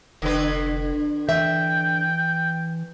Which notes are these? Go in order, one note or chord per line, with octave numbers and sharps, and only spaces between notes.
F1 D3 B4
E3 E5 G5